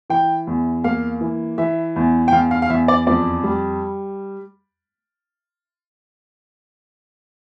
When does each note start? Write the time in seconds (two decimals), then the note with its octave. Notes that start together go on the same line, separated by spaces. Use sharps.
0.10 E3 G5
0.47 E2
0.84 A#3 F5
1.21 E3
1.58 E3 E5
1.96 E2
2.28 G5
2.32 E2 F5
2.51 F5
2.62 F5
2.70 E2 E5
2.88 D5
3.07 F2 D5
3.44 G3